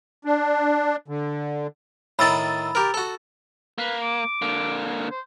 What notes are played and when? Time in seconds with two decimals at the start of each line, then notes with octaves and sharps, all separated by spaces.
0.25 D4
1.08 D3
2.19 A2 D#3 B5 E6 A6
2.75 G4 A#4
2.94 F#4 A4
3.78 A#3 B4
4.02 D6
4.42 D3 A#3
5.11 C5